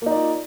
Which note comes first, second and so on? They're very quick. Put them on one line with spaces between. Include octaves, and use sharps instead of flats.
A#3 D#4 D5 F4